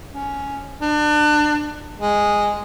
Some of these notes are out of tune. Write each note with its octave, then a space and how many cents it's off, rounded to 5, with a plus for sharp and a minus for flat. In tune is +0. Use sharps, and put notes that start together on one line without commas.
C#4 +10
D4 +30
G#3 -5